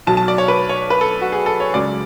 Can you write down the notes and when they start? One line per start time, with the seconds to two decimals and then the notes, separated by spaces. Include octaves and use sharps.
0.07 B1 B2 F#3 A5
0.17 A5
0.28 D5
0.38 C#5
0.48 B4
0.69 C#5
0.90 B4
1.01 A4
1.21 F#4
1.32 G#4
1.46 A4
1.60 C#5
1.74 C#2 C#3 F#3 D5